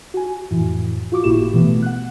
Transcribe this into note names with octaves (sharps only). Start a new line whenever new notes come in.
F#4 G#5
F2 A2 E3
F4 F#4 C#6 D6
G1 A2 A#3 E4 G4 E7
B2 E3 A3 B3
F#5 F#6